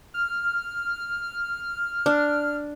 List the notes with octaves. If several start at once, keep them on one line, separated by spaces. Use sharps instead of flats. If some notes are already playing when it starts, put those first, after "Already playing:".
F6
D4